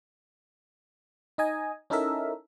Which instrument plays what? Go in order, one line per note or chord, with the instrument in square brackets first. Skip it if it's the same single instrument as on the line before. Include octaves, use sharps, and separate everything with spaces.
[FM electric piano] D#4 D#5 G#5
C#4 D#4 E4 A4 A#4 E5